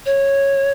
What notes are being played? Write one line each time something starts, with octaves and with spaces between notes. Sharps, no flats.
C#5